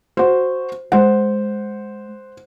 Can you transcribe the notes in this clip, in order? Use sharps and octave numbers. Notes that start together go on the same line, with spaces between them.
F#4 C5
G#3 C5 F#5